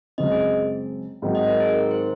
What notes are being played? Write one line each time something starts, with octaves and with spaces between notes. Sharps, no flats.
F#1 F#2 C#3 G#3 C4 D#5
G#4
G#2 D#3 F#3 C4 D#4
D#5
A#4
G#4
A#4
C5